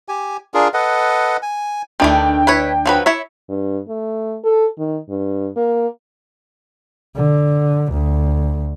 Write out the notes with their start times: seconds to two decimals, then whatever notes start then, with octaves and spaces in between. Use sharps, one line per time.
0.09 G4 G#5
0.54 D4 F4 G#4 A#4
0.74 A4 B4 D#5 F#5
1.42 G#5
2.00 D2 D#3 E3 A3 D4 G5
2.47 E4 B4 C#5
2.86 F3 F#3 B4
3.06 E4 C#5 E5
3.49 G2
3.88 A3
4.44 A4
4.78 D#3
5.09 G2
5.57 A#3
7.16 D3
7.92 D2